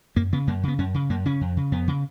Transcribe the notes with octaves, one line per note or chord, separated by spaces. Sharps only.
F#2 A#3
C#3 B3
F#2 A#3
C#3 B3
F#2 C#4
C#3
F#2 A#3
C#3 C#4
F2
C#3
F2 B3
C#3